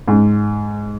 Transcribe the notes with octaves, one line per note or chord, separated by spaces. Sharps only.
G#2